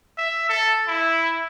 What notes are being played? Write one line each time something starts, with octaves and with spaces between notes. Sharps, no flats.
E5
A4
E4